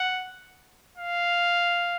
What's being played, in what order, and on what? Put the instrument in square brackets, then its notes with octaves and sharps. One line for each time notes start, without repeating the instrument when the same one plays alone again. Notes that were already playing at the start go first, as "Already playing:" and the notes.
Already playing: [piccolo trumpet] F#5
F5